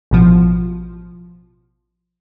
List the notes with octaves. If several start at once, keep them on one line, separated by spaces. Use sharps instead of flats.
A1 B2 F3